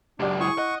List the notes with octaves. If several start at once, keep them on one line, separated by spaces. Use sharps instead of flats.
C#2 F#2 D4 G4 D5
E4 G#4 C#6
D#5 F#5